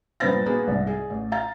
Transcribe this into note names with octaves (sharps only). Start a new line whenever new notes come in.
G2 A#2 B3 C5 A6 A#6
A#3 B3 F#4 G#4
C2 G#2
G#4
A1
F5 A#5 A6